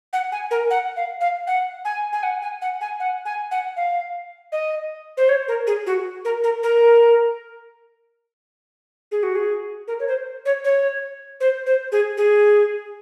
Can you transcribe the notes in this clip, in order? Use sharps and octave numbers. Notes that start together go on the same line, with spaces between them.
F#5
G#5
A#4
F#5
F5
F5
F#5
G#5
G#5
F#5
G#5
F#5
G#5
F#5
G#5
F#5
F5
D#5
C5
C#5
A#4
G#4
F#4
A#4
A#4
A#4
G#4
F#4
G#4
A#4
C#5
C5
C#5
C#5
C5
C5
G#4
G#4